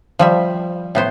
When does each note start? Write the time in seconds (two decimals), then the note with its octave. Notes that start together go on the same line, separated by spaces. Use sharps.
0.19 F3 G3 E5
0.95 A2 B3 C5